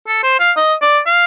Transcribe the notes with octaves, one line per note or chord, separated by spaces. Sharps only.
A4
C5
F5
D#5
D5
F5